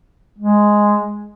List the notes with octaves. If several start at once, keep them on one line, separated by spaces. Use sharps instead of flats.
G#3